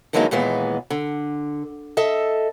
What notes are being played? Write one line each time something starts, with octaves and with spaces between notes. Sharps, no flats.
D3 E3 F#3 G#3 A#3 D#4
D#2 A#2 E3 G#3 B3
D3
A4 D#5 E5